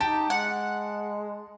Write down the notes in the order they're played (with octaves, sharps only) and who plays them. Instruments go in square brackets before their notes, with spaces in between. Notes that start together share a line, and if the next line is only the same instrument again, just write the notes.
[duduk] D#4 [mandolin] G4 [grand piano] A5
[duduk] G#3 [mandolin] F#5